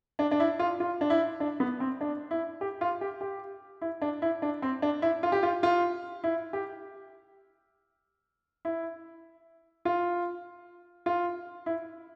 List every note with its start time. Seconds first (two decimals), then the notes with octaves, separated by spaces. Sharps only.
0.19 D4
0.31 D4
0.40 E4
0.59 F4
0.80 F4
1.01 D4
1.10 E4
1.40 D4
1.60 B3
1.80 C4
2.01 D4
2.31 E4
2.61 G4
2.81 F4
3.01 G4
3.21 G4
3.82 E4
4.02 D4
4.22 E4
4.42 D4
4.62 C4
4.82 D4
5.02 E4
5.23 F4
5.32 G4
5.43 F4
5.63 F4
6.24 E4
6.53 G4
8.65 E4
9.85 F4
11.06 F4
11.66 E4